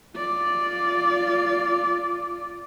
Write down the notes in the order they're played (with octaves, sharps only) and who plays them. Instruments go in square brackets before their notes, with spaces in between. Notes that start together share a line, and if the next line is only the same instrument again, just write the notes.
[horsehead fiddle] F4 D5